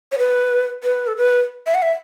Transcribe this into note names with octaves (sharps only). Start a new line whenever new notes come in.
C#5
B4
B4
A4
B4
E5
F#5
E5